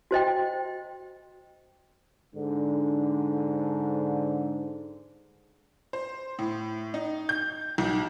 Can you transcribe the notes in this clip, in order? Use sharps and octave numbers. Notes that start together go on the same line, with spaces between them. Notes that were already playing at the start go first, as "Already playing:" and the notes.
F#4 C5 D#5 G5
G#2 D3
C5
A2
D#4
G6
B1